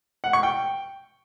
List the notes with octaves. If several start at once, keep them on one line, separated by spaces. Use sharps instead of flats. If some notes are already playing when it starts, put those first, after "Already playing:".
F#5
C#6
G5